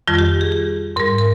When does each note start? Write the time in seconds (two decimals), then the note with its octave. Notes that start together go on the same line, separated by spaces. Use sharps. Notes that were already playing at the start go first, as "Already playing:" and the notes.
0.08 F2 D#3 G3 F4
0.18 G4
0.41 G#4
0.52 G#4
0.96 G#2 G3 A#4
1.18 A#4